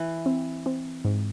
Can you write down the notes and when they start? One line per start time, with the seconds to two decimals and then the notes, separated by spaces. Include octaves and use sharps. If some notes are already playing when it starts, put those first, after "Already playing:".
Already playing: E3
0.26 C4
0.66 C4
1.05 G#2